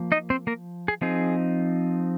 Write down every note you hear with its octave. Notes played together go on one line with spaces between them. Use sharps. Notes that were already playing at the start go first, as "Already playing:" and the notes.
Already playing: F3 A#3
D#4 D#5
C4 C5
A#3 A#4
G#4
F3 C4 D#4 G#4